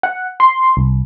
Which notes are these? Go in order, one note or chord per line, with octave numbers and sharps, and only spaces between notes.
F#5
C6
C2